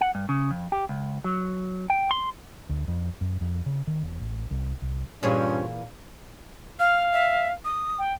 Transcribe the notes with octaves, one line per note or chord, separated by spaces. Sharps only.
F#5
G2
C#3
F2
G4
C#2
F#3
G5
C6
D2
F2
F#2
F2
C#3
D#3
E1
A1
C2
C2
G2 A#2 E3 C#4 F4 G#4 C5 C#5
F5 F6
E5
D#6
G5